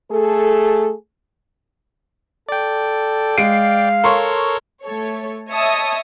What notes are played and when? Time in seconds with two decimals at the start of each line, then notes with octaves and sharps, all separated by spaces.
0.11 A3 G#4 A4
2.49 A4 D5 G5
3.38 G#3 F5 C7 D7
4.04 A4 A#4 C#5 C6 C#6
4.83 A3 A4 C#5
5.49 C#5 D#5 E5 A5 D#6 E6